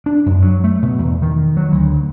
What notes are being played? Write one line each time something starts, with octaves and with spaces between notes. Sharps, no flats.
D4
F#2
F#3
A3
B2
E2
D#3
F#3
D2